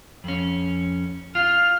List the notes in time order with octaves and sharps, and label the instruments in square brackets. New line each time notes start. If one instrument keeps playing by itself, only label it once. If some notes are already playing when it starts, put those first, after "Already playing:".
[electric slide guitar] F2 C#4
[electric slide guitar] F4 [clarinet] F6